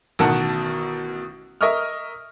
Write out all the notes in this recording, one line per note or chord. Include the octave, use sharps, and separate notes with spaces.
A1 B2 D#3 A#4 F#5 A5
A#4 D#5 E5 C#6 D#6 F6